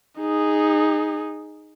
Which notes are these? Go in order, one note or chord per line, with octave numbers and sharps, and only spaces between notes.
D#4 G#4